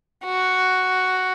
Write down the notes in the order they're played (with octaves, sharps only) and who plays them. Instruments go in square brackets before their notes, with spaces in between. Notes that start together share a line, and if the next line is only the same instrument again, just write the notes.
[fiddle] F#4